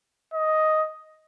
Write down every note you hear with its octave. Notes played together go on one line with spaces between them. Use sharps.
D#5